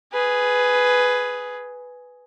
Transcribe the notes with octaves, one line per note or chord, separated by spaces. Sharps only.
G#4 B4